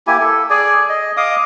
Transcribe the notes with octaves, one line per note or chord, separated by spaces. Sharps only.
A#3 E4 G4 G#5
A4
G#4 D5 G#5
D#5
D#5 F5 D6 D#6